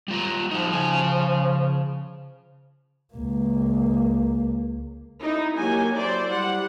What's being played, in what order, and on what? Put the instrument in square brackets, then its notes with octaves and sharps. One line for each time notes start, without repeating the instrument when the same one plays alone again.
[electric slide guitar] G3 F4 A#5
[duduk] F3 [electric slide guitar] D#4 F#4
[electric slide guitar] C#3 G#5
[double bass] C#2 A#3
[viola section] D#4 E4
F#3 A#3 G4 G#5
E4 C5 D5
G3 F#5